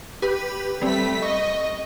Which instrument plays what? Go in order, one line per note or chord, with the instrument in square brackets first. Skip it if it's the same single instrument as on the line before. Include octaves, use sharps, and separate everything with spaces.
[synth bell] G4 B4 B5
[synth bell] G3 C4 [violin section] A3 B6
[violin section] D#5 [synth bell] C#6